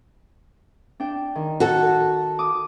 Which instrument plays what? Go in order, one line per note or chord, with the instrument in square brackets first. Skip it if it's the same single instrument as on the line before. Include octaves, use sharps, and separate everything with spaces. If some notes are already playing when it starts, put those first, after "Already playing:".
[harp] D4 G5
D#3
[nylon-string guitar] F#4 A4
[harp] D6 D#6